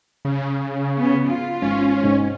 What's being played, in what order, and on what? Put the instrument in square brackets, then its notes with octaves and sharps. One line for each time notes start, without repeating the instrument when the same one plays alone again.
[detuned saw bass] C#3
[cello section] B3 C#4
F4
[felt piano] G#1 [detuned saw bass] C#4
[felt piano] G#2